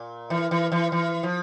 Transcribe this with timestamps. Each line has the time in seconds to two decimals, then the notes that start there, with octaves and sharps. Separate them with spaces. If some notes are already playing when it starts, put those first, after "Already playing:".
Already playing: A#2
0.30 E3
0.51 E3
0.72 E3
0.92 E3
1.23 F3